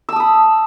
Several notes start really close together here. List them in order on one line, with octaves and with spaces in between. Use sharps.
E6 A5 D#6 B5